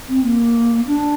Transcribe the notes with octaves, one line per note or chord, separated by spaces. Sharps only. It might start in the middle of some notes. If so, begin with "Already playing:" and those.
C4
A#3
D4